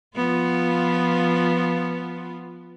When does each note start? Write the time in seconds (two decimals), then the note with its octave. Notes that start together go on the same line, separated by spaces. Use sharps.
0.16 F3 B3 F4